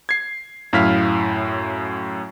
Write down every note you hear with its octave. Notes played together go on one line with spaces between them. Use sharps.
G#6 C7
F#2 A2 E4 F5 F6 B6